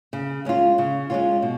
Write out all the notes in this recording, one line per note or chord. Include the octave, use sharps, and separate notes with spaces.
C#3
G#3 C#4 F4
C#3
G#3 C#4 F4
B2